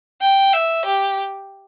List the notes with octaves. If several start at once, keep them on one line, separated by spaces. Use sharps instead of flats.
G5
E5
G4